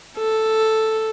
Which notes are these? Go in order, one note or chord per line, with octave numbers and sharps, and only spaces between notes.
A4